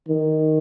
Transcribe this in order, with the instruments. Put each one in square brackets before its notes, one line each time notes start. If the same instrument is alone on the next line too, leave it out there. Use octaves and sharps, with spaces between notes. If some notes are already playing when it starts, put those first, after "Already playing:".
[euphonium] D#3